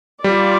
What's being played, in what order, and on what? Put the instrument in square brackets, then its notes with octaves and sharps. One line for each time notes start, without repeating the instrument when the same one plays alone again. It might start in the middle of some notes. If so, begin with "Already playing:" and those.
[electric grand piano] G3 [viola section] F4 D5